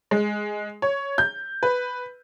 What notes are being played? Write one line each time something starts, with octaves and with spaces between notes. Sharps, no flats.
G#3
C#5
G6
B4